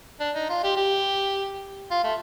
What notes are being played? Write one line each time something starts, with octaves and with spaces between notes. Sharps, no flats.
D4
D#4
F4
G4
G4
F4
A3